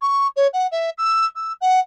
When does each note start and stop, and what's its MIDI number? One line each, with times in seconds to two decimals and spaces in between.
0.01 0.27 85
0.36 0.47 73
0.53 0.67 78
0.71 0.90 76
0.98 1.25 88
1.35 1.53 88
1.61 1.80 78